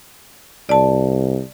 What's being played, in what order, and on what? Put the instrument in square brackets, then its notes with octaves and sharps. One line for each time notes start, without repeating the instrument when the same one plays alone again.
[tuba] C2 [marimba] D5 A5